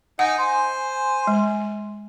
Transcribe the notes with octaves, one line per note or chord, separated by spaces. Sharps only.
D#4 F#5 G#5
C5
G#3